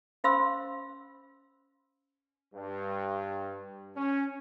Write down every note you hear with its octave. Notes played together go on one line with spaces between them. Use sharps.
C#4 C5 F5 B5 C6 E6
G2
C#4